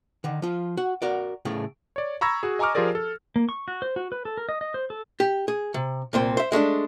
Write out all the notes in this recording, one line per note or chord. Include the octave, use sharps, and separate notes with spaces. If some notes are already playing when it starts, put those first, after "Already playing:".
D3 D#3
F3 F4
F#4
F#4 A#4 D5
A2 C#3 A3 G#4
C#5 D5
A#5 B5 C#6 E6 G#6 A#6
F#4 G#4
D#5 G#5 A#5 C#6 D6 F6
F3 F4 G4 G#4 A#4 D5
A4
A#3
C#6
F#4
C5
F#4
B4
A4
A#4
D#5
D#5
C5
A4
G4
G#4
C3
C2 A#2 C4 C5
C5 E5
G#3 A3 C#4 D4